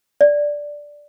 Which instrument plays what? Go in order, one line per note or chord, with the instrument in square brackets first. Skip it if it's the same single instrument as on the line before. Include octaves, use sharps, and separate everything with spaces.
[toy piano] D5